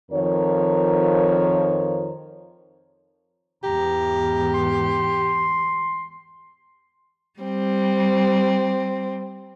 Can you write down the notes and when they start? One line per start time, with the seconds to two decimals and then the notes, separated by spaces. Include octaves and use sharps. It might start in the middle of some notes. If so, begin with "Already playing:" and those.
0.12 F2 D#3 F3 A#4 C#5
3.64 E2 G#2 G4 A#5
4.54 C6
7.40 G3 C4